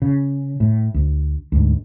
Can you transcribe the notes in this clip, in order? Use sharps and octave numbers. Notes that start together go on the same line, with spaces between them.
C#3
A2
D2
D2 G#2